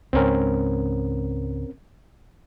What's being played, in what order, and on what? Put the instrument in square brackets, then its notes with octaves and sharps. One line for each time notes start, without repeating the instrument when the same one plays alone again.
[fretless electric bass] C#2 G#2 [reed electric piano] C4 C#4 A#4